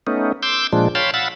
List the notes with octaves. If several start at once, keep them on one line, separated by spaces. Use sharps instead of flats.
A3 B3 C#4 D#4
C6 D6 E6 G6
A#2 F3 G#3 D4
C#5 F5 G5 A5 B5 C6
F5 F#5 B5 E6 A6